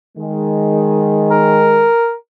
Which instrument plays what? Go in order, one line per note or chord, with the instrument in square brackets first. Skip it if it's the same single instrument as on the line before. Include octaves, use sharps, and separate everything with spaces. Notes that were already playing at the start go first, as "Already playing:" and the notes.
[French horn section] D#3 G#3
[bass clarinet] A#4